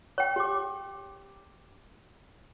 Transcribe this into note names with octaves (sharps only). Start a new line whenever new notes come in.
C#5 G5
G4 D6